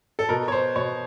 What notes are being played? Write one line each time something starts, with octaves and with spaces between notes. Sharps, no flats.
A4
B2 A#4
C#5
C5
B2 C#5